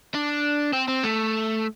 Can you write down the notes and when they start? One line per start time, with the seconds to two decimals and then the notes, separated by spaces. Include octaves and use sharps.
0.15 D4
0.73 C4
0.88 C4
1.04 A3